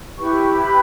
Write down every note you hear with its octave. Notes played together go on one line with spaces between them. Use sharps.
E4 G4 B4 C#6
B5